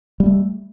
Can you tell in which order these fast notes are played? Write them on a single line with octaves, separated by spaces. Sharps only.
G3 A#3 A3